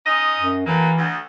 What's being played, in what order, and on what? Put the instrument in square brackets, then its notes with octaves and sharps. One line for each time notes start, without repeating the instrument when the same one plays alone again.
[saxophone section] C#4 D#4 D#5
[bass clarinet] F#2
[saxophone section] A2 F#3 A#3 [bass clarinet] E3
[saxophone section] D2